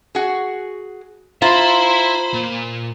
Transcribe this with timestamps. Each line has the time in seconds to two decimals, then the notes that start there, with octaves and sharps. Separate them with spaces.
0.15 F#4 G#4
1.42 E4 F4 C5 E5 A#5 B5
2.34 A#2